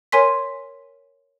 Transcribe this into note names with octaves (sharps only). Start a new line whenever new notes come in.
A#4 C#5 G#5 C6 B6